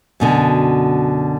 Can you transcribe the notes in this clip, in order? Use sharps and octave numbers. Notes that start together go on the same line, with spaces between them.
F#2 B2 D3